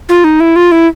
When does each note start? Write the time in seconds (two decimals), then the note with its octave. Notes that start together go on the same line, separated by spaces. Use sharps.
0.09 F4
0.24 D#4
0.40 E4
0.56 F4
0.72 E4